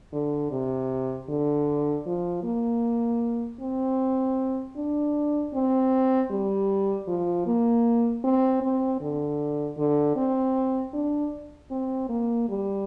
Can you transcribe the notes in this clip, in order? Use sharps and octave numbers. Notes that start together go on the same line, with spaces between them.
D3
C3
D3
F3
A#3
C4
D4
C4
G3
F3
A#3
C4
C4
D3
D3
C4
D4
C4
A#3
G3